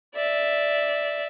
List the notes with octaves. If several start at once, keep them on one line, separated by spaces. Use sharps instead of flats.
D5 E5